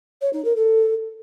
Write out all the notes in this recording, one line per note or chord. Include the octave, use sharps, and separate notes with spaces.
C#5
D#4
A#4
A4